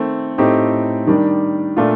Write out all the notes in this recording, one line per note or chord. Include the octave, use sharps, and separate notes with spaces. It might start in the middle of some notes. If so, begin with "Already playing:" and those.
Already playing: D#3 A3 C4
A2 A3 C4 D#4 G4
D#3 G3 D4
A#2 A3 D4 F4